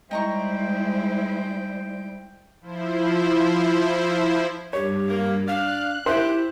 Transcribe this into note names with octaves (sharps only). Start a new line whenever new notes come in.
G3 G#3 D#4 E4 C5 G5 A#5 C#6
F3 E4 C5
G2 G4 C#5
A#3
D4 D5 F5 F#6
E4 G4 C5 E5 C6